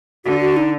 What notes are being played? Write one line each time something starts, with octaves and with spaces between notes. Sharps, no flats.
D3 F#4
F#4
D#4